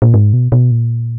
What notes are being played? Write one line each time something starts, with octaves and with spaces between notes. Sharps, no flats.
A#2
G#2
B2
B2
A#2